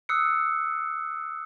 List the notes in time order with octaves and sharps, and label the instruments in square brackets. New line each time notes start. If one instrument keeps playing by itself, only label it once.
[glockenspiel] D#6 E6 F#6 C7 C#7